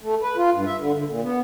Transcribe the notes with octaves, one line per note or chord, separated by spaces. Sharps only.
A3
B4
F4
G2
E5
D3
D3
A#2
B3